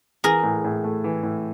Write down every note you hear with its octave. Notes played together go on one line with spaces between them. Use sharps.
E3 G#4 A#4
A2
A2
A3
E3
A2